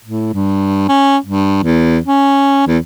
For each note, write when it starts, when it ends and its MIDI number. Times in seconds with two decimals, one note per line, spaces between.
0.04 0.32 45
0.33 0.87 43
0.88 1.17 61
1.26 1.62 43
1.63 1.98 40
2.05 2.64 61
2.67 2.78 40